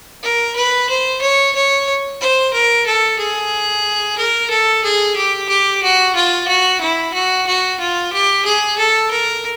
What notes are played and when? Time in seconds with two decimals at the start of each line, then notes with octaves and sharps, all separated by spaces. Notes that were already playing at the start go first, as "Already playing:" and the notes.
0.23 A#4
0.56 B4
0.89 C5
1.22 C#5
1.55 C#5
2.21 C5
2.53 A#4
2.86 A4
3.19 G#4
4.18 A#4
4.50 A4
4.84 G#4
5.16 G4
5.49 G4
5.83 F#4
6.15 F4
6.48 F#4
6.81 E4
7.14 F#4
7.47 F#4
7.80 F4
8.13 G4
8.45 G#4
8.79 A4
9.11 A#4